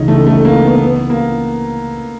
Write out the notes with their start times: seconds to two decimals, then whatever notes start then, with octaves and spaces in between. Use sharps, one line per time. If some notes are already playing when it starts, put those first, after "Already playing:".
Already playing: C#2 C#3 E3 G#3 C#4 D#4
0.08 A3
0.27 A3
0.45 A#3
0.64 B3
0.82 B3
1.10 A#3